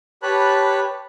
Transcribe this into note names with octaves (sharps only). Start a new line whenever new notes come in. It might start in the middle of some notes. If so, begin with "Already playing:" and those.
G4 B4 C#5 A5 B5 F#6